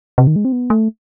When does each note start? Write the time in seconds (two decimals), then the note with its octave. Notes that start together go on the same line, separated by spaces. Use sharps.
0.18 C3
0.27 D#3
0.36 G#3
0.45 C4
0.52 B3
0.70 A3